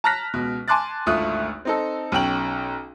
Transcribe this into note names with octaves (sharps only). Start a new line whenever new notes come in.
A5 A#5 F6 F#6 A#6 B6
C#2 B2
G#5 A5 C6 D6 F#6 A6
G#1 D2 A3 F4 D#6 F#6
C4 D#4 A4
B1 C#4 G5 F#7